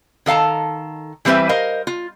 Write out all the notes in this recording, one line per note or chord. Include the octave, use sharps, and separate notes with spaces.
D#3 A4 F5 A5 A#5
E3 G3 C4 B4 C5 E5
A#4 C5 D#5 F5
F4